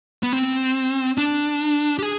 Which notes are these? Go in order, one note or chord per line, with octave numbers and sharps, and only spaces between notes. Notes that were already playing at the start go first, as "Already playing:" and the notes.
B3
C4
D4
G4
G#4